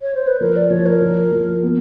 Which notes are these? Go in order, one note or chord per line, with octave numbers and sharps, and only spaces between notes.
C#5
C5
B4
F3 A#4
D5
F3 C#5
A#4
F3
F3
B3